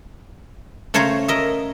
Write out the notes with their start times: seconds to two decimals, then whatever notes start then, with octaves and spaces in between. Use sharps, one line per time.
0.94 C#3 A3 C5 C#5 A#5
1.28 A#4 D#5 E5